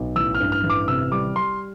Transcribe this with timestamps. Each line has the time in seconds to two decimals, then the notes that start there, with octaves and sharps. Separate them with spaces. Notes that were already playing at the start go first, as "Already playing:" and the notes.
Already playing: B1
0.16 A1 E6
0.34 F6
0.40 G2
0.52 F6
0.64 A1
0.70 D6
0.88 C3 E6
1.11 G3 D6
1.36 G3 C6